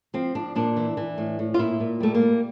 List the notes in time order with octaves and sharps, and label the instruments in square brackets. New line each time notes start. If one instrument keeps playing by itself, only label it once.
[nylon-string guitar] F3 C4
F3 D4
A#2 D4
E3
E3
A2
A2
F4
A#2 E4
A#2
G3 A3
A#3
G3